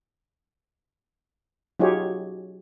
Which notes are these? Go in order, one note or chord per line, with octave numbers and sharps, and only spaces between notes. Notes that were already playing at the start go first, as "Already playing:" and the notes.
F#3 D#4 F4 G4 G#4 C#5